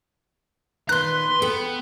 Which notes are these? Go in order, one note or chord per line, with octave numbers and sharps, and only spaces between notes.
A#2 D#3 B4 A#5 C6 F#6
B3 A4 G5